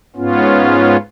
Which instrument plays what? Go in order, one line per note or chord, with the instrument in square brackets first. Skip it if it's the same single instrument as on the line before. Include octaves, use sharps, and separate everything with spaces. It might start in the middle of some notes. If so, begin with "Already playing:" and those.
[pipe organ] G#2 B3 C#4 F4